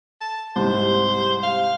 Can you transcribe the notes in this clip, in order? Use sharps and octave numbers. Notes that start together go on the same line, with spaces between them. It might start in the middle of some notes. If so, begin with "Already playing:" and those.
A5
C2 G#2 C5
F5